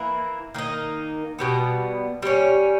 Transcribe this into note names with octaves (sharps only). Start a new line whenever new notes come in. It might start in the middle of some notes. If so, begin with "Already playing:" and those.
Already playing: E3 A#3 E4
D#3 A#3 D#4
B2 G3 B3
G3 A#3 C#4